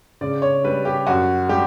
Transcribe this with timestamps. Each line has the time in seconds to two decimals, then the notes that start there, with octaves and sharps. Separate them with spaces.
0.21 C#3 D5
0.42 C#5
0.64 G3 B4
0.85 G4
1.07 F#2 F#4
1.49 G3 G4